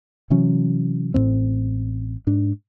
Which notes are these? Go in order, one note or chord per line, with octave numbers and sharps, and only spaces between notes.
C3 E3 F#3 C#4
A1 A2 C3 C4
G#2 D4